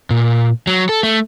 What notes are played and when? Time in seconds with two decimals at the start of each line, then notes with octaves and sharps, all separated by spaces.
0.10 A#2
0.67 F#3
0.89 A4
1.03 A3